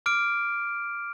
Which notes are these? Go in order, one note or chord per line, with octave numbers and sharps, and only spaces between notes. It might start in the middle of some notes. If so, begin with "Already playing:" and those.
D6 F6 D7